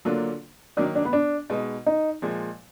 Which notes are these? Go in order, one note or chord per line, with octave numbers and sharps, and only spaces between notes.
D3 F#3 A#3 D4 F4
D#3 F#3 A#3 D4
D4
B3
D4
B2 G#3 D#4
D#4
A#2 F3 G#3